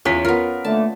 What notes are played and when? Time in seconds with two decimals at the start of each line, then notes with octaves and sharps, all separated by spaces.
0.05 E2 C#4 F4 B6
0.25 B3 F4 A#4
0.65 D3 A3 A#3 A5